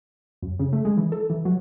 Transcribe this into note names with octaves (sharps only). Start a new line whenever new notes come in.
F#2
C#3
A3
G#3
E3
A4
E3
F#3